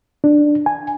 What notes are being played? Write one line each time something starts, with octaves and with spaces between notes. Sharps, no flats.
D4
G#5